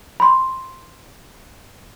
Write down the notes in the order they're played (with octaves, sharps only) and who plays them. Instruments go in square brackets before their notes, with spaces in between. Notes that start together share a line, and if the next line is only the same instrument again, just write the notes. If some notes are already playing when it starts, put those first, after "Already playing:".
[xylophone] B5 C6